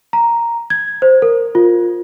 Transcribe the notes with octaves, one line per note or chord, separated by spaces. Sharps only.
A#5
G#6
C5
A#4
F4